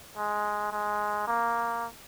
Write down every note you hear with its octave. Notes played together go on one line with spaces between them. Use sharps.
G#3
G#3
A#3